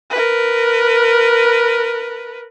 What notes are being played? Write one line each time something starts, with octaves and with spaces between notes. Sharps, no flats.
A#4 B4